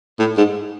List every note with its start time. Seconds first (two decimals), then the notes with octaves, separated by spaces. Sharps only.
0.19 A2
0.37 G#2